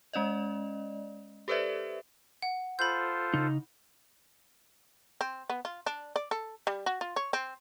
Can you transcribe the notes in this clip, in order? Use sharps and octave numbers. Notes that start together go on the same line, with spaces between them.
G#3 C#4 D5 D#5
G4 A4 B4 C5 D5 E5
F#5
F4 A4 C5 B5 G6
C#3 D#4
C4
B3
F4
D4
D5
A4
G3
F#4
F4
C#5
C4